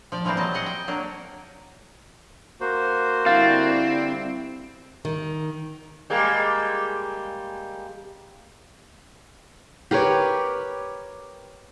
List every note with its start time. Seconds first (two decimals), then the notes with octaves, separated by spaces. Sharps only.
0.12 F3 D5
0.25 E3 F3 G3 A#3 C4
0.37 F#3 D#5 A5
0.54 G#4 D#5 F#5
0.66 G5
0.88 F#3 A#3 D4
2.61 A#3 F#4 C5
3.26 D3 G3 C4 E4 F5 A6
5.05 D#3
6.10 G3 G#3 A#3
9.91 G4 A#4 B4 C#5